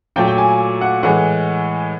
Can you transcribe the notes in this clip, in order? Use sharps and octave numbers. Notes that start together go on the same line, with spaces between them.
A#2 F#3 A3 G5
G5
G#5
F#5
A2 E3 G#3 F#5